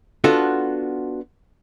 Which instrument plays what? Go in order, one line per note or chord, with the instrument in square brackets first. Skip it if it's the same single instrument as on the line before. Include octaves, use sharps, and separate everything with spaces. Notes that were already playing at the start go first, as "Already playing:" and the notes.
[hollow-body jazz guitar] B3 D4 F4 F#4 A4